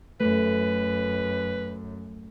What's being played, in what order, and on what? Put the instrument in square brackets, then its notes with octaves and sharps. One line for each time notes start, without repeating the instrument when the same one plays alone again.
[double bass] F#2 [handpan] A3 [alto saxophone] B4